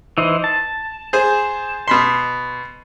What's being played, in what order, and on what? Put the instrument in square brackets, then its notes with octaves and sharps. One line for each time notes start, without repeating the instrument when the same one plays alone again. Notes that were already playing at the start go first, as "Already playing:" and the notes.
[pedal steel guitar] E3 D#4 C5
A5
[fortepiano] G#4 C5
B2 B5 C6